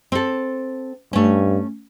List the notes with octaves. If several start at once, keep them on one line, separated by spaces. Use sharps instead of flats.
C4 A4
G2 A3 C#4